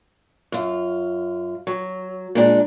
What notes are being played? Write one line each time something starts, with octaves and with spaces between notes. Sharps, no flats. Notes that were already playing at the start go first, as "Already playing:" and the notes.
F#2 F4
F#3
A#2 G#3 D4